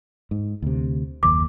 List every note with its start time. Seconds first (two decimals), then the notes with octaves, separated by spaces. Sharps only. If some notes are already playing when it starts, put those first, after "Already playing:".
0.31 G#2
0.62 D2 C3
1.23 F#1 D#2 D6